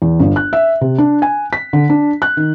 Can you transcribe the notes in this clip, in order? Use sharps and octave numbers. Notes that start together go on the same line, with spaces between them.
E2
G1
F#6
E5
C3
D4
G#5
B6
D3
D4
F#6
D#3